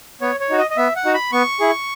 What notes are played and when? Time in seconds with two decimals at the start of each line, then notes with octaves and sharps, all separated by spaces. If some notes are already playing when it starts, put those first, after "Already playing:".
0.21 B3 C#5
0.40 C#5
0.50 D#4 F#4
0.58 D#5
0.71 D#5
0.77 B3 E5
0.96 F#5
1.05 D#4 F#4
1.14 B5
1.32 B3 C#6
1.60 E4 G#4